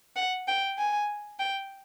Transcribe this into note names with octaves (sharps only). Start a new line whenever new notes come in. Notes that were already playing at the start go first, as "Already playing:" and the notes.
F#5
G5
G#5
G5